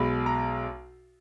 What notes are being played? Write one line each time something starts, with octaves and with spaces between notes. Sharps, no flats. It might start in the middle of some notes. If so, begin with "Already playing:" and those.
Already playing: B1 B2 G#3 B5
A#5